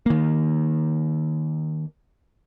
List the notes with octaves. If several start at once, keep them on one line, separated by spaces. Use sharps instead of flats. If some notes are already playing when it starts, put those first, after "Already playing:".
D#3 A#3